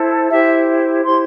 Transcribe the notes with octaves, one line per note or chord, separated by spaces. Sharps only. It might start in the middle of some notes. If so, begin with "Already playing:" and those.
Already playing: E4 A4 C5
E4 G4 C5 E5
E4 G4 C5 C6